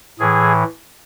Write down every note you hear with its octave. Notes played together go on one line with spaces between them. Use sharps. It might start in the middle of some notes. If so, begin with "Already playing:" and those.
A2 E3 G#4